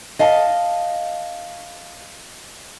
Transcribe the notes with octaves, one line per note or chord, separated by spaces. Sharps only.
D#5 F5 A5